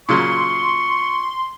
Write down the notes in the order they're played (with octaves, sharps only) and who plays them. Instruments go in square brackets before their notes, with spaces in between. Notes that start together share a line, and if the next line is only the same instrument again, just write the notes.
[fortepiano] A#2 C#3 F#3 [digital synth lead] C6 [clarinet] C#6